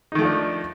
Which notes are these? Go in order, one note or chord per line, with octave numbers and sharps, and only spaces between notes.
D#3 F3 A3 D4 D#4